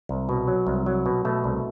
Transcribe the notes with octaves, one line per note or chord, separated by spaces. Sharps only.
C2
B2
F#3
C2
F#3
B2
B2 A3
C2